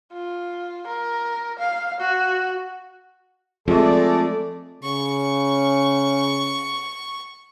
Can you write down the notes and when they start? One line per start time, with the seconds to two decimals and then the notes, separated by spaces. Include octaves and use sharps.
0.12 F4
0.87 A#4
1.59 F5
2.00 F#4
3.68 F3 G#3 A3 C4 A4 D5
4.83 C#3 C#6